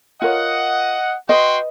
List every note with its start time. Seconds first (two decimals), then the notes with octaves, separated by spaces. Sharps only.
0.22 F4 A#4 C#5 D#5 F#5
1.29 F#4 B4 D#5 G5 C6